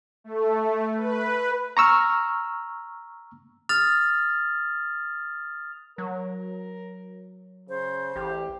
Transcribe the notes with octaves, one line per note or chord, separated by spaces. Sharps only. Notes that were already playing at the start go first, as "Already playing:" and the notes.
A3
B4
A#5 C#6 E6 F6
D#6 F6 A6 F7
F#3 A#4
C#3 C5
A1 G4